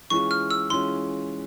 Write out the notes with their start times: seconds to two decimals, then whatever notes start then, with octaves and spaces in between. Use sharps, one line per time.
0.10 E3 G#3 C#4 F4 C#6
0.31 F6
0.51 E6
0.70 E3 G#3 C#4 F4 C6